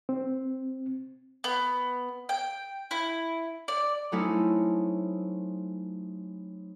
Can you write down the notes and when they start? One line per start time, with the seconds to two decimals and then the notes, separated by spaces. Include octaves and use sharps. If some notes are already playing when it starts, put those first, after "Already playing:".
0.09 C4
1.44 B3
2.29 G5
2.91 E4
3.68 D5
4.12 F#3 A3 C4 C#4 D#4 E4